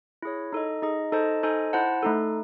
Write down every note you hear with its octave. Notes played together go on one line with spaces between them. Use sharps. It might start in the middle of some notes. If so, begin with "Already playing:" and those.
E4 G#4 C#5
D#4 A4 D#5
D#4 G#4 D#5
D#4 A4 C5 D#5 A5
D#4 A4 C5 D#5 G#5
E4 C5 F#5 A5
A3 D#4 A4